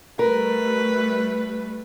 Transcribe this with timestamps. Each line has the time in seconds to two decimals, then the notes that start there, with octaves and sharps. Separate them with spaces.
0.19 G3 A3 A#4 B4